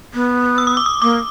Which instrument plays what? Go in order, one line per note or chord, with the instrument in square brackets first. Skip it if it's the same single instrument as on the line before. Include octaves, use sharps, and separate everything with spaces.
[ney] B3
[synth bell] E6
D#6
D6
D#6
[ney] A#3 [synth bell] D6